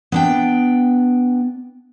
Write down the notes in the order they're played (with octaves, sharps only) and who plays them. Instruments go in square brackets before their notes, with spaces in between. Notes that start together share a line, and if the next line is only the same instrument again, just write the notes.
[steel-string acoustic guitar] B3 D4 G5